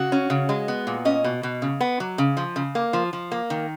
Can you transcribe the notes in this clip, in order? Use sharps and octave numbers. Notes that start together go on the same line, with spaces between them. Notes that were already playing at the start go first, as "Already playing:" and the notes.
Already playing: C#3 F#4
C#4
C#3
G#3
B3
A#2
C#4 D#5
B2
B2
C#3
B3
F#3
C#3
F3
C#3
A#3
F3
F3
A#3
D#3